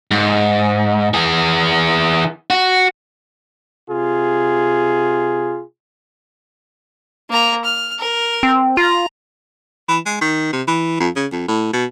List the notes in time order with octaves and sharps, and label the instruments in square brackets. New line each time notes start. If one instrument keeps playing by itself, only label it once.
[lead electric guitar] G#2
E3 G#4
F#4
[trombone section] C3 F4 G#4
[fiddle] A#3 A#5
F6
A#4
[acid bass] C4
[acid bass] F4 [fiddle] A#5
[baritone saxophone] E3
G#3
D#3
C3
E3
F2
C#3
F2
A2
B2